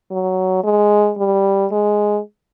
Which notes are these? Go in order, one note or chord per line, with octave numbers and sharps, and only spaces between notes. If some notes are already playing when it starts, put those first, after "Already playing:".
F#3
G#3
G3
G#3